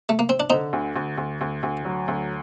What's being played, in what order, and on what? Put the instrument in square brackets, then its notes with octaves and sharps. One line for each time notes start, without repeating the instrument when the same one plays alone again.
[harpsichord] A3
A#3
C4
D4
[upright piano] D3 [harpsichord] C4 D#4
[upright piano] D2
D2
D2
D2
D2
F#3
D2